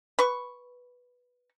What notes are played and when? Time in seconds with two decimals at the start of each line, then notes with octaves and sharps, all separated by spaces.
0.19 B4 C#6